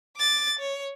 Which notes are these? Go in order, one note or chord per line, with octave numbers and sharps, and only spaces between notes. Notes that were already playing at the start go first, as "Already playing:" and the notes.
D6 A6
C#5